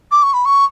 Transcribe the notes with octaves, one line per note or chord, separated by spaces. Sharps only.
D6
C#6
B5
C#6